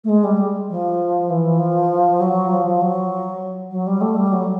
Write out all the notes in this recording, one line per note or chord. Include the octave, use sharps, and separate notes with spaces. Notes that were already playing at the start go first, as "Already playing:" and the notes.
A3
G#3
G3
F3
E3
F3
F#3
F3
F3
F#3
F#3
G3
A3
G3
F#3